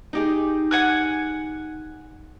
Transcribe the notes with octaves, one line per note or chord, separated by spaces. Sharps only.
D#4 G4 G#4
F#5 G#5 F#6